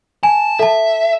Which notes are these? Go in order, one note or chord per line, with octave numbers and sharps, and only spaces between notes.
G#5 A5
A4 E5 A5